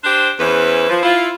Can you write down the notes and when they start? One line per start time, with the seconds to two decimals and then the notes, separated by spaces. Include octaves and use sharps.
0.04 D4 G4 C5
0.39 E2 E3 C#4 B4 C5
0.89 F3
1.03 E4 F4